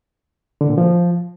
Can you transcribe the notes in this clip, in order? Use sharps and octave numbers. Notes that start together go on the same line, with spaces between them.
D3
A#2
F3